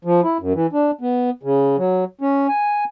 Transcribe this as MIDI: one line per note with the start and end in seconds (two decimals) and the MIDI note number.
0.05 0.21 53
0.23 0.38 64
0.40 0.53 42
0.55 0.67 52
0.73 0.91 62
1.01 1.30 59
1.43 1.76 49
1.78 2.04 54
2.21 2.47 61
2.48 2.84 80